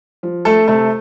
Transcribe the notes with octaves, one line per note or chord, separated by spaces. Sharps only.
F3
A3 A4
C3 A3 A4